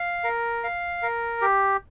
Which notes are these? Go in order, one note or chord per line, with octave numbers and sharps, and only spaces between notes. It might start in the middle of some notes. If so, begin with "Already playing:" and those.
Already playing: F5
A#4
F5
A#4
G4